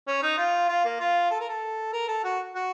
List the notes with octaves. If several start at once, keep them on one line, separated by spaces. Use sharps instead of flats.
C#4
D#4
F4
F4
A#3
F4
A4
A#4
A4
A#4
A4
F#4
F#4